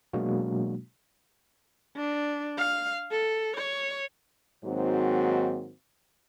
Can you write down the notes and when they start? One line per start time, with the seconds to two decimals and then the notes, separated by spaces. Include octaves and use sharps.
0.13 B2 F#3 G#3 A#3 D4 F#4
1.96 D4
2.58 F5
3.11 A4
3.57 C#5
4.65 G#2 D#3 F#3 A#3 C4 F#4